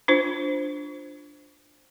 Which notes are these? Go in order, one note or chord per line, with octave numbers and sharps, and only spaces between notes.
D4 F4 C5